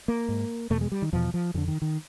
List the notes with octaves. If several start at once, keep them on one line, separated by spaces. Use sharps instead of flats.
A#3
G#2
E2 B2 A3
G#3
G3
D#3
E2 B2 F3
F3
F2 D3 E3
D#3
D#3